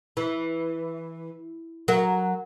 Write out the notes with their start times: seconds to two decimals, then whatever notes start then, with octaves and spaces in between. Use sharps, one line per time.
0.17 E3
1.88 F#3 A#4